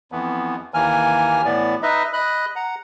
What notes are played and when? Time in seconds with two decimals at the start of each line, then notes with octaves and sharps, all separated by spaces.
0.12 F2 E3 B3
0.74 D#2 D#3 E3 A#3 G#5 F6
1.45 A2 E3 B3 D5
1.83 D#4 B4 D#5 E5
2.13 D#5 B5 F#6
2.56 F#5 A#5